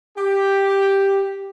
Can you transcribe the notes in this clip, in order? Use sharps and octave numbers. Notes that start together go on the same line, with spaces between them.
G4